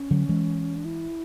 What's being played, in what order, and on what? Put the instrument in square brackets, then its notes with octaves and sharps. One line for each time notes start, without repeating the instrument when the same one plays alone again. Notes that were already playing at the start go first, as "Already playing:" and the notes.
Already playing: [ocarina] C#4
[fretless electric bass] D3 F#3
E3 G#3
[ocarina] D4
E4